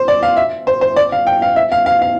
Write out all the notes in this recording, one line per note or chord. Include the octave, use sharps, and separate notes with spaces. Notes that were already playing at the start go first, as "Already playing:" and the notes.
Already playing: C5
D5
F5
E5
C5
C5
D5
F5
G5
F5
E5
F5
F5
F5